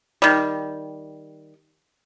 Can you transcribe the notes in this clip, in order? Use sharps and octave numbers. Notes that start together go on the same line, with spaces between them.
D#3 G3